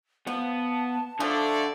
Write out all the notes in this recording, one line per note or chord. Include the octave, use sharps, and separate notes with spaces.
F3 B3 A5
D3 F3 A3 A4 D5